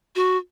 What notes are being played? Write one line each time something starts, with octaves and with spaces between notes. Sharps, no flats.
F#4